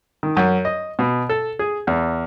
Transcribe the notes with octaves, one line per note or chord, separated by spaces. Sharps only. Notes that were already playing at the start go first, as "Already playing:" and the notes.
D#3
F#2
D#5
B2
A4
G#4
E2